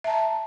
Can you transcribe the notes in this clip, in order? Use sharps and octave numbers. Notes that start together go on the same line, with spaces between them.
E5 A5 A#5